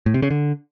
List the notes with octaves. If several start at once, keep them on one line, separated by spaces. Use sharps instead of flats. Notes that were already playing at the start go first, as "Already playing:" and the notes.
A2
C3
C#3
D3